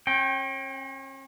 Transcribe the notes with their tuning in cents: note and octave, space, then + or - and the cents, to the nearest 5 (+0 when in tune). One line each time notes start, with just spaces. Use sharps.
C#4 -40 G5 +0